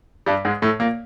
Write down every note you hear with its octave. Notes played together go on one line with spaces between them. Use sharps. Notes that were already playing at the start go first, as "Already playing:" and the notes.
G2 G3
G#2 G#3
A2 A3
A#2 A#3